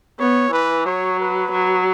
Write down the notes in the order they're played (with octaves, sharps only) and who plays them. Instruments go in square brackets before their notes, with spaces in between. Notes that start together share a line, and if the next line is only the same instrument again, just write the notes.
[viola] B3 [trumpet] C#5
[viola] E3 [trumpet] B4
[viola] F#3 [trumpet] C#5
[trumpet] B4
[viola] F#3